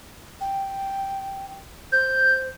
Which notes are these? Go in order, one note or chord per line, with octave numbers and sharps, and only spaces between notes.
G5
C5 G6